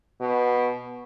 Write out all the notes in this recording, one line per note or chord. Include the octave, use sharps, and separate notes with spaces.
B2